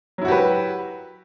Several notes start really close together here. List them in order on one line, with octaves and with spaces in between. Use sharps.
F#3 E4 F#4 G4 B4